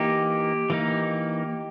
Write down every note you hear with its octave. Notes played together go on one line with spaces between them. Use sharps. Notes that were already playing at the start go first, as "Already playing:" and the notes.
Already playing: E3 A#3 D#4 G4
E3 A#3 D#4